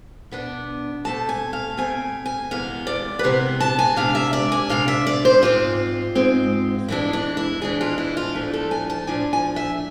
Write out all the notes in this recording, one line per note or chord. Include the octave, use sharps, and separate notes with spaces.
B2 B3 D4
B2 A3 C4 A5
G#5
F5
B2 A3 C4 G#5
G#5
E2 C3 G#3 B3 F5
D5
B4
E2 C3 G#3 B3 C5
A5
G#5
C3 G#3 D4 F5
E5
D5
G#5
C3 G#3 D4 F5
E5
D5
C5
G#2 G#3 C4 F4
G#2 G#3 C4
A2 E3 G#3 D4 E4
D4
E4
A2 E3 G#3 D4 G#4
F4
E4
F4
A2 F3 A3 D4
A4
G#5
A5
A2 F3 A3 D4 G#5
G#5
E5